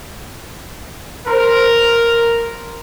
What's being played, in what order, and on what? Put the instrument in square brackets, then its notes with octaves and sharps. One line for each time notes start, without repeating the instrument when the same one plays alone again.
[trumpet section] A#4 [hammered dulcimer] C5